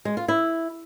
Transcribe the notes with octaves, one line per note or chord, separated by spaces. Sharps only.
G#3
F4
E4